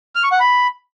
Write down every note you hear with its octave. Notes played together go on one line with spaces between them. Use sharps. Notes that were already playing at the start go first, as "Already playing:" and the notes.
F6
C#6
F#5
B5